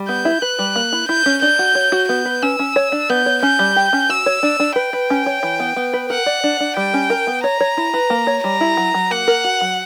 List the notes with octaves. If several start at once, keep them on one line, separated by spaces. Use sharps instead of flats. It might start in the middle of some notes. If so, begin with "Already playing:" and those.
Already playing: G3
B3 G6
E4
B4 F#6
G3
A#3
E4
E4 G6
C#4
D4 G6
F#4
C#5
F#4
B3 G6
B4
C#4 E6
C#4
C#5
D4
B3 G6
C#5
C#4 G6
G3
G4
C#4
F#4 E6
C#5
D4
D4
B4 G5
B4
C#4
C#5
E3
B3
B3
B4
A#4 F#5
D5
D4
D4
G3 G5
C#4
A#4
B3
C#5 A#5
C#5
E4
B4
A#3
C#5
G3 A#5
E4
F#3
F#3
A#3 F#5
A#4
F#4
F#3